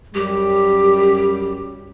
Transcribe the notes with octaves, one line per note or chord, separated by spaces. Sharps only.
F#2 G3 G4